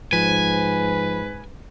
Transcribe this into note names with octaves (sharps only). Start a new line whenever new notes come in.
G#2 F3 B4 G#5